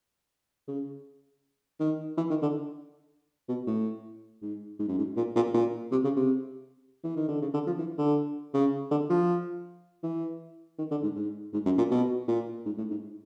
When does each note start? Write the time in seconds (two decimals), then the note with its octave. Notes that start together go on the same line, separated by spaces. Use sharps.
0.68 C#3
1.80 D#3
2.17 E3
2.30 D#3
2.42 D3
3.49 B2
3.67 A2
4.42 G#2
4.79 G#2
4.88 F#2
4.98 G#2
5.17 A#2
5.35 A#2
5.54 A#2
5.92 C3
6.04 C#3
6.17 C3
7.04 E3
7.16 D#3
7.28 D3
7.42 C#3
7.54 D3
7.67 F3
7.79 E3
7.98 D3
8.54 C#3
8.91 D3
9.10 F3
10.03 E3
10.79 D#3
10.91 D3
11.03 G#2
11.16 G#2
11.53 G#2
11.66 F#2
11.78 A#2
11.91 B2
12.28 A#2
12.66 G#2
12.78 A2
12.91 G#2